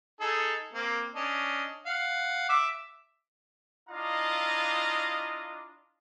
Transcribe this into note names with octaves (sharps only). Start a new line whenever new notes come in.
D#4 G#4 A4
A#3 C4
C#4 D4 D#5
F5 F#5
E5 D6
D4 E4 F4 D#5 F5 A#5